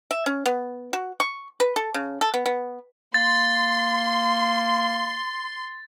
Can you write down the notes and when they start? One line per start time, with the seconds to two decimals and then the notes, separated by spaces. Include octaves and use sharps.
0.11 E5
0.26 C#4
0.46 B3
0.93 F#4
1.20 C#6
1.60 B4
1.76 A4
1.94 C#3
2.21 A4
2.34 B3
2.46 B3
3.14 A#3 C6 A6